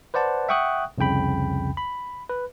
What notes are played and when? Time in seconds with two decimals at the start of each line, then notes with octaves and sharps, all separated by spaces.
0.14 B4 C5 D5 F#5 A5
0.49 E5 F#5 G5 C#6 D#6 F#6
0.98 C2 F2 C#3 G5 B5
1.77 B5
2.30 B4